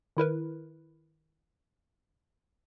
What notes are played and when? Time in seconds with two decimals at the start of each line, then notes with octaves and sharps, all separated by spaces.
0.17 D#3 E4 A#4 B4